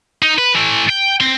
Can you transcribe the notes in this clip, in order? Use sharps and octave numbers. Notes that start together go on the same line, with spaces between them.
D#4
B4
E3 A3
G5
C4 C6